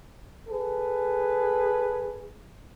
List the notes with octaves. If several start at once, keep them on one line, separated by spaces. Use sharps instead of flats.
G#4 A4 B4